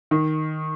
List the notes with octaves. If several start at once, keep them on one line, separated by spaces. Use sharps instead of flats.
D#3